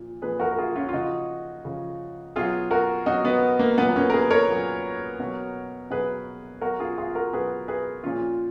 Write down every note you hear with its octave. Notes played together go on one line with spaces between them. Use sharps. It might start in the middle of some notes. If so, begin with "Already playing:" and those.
Already playing: A#2 F3
A#2 F3 G#4 B4
F#4 A#4
A#4
F4 G#4
C#4 F4
F4
C#3 F3 D#4 F#4
C#3 F3
B2 F#3 F4 G#4
F#4 A#4
B2 F#3 D#4 F#4
B3
A#3
A#2 F#3 B3
B3
A#3 C#4
A#4
G#4 B4
A#4 C#5
A#2 F#3
B2 F#3
B2 F#3 G#4 B4
B2 F#3 F#4 A#4
F4 G#4
F4 G#4
F#4 A#4
B2 F#3 G#4 B4
G#4 B4
A#2 F3 C#4 F4